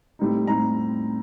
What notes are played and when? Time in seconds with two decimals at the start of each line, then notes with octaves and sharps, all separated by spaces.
0.19 A2 G3 C4 D#4
0.47 A2 G3 C4 D#4 A#5